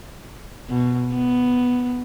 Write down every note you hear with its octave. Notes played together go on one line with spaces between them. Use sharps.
B2
B3